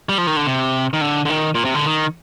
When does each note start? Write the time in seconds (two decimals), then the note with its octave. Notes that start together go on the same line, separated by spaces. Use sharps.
0.09 G3
0.18 F3
0.27 D#3
0.37 D3
0.46 C3
0.93 D#3
1.01 D3
1.25 D3
1.30 D#3
1.55 A#2
1.65 C3
1.75 D3
1.86 D#3